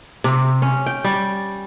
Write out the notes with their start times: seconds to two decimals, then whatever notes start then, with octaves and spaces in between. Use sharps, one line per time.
0.24 C3
0.62 C#4
0.86 G5
1.05 G3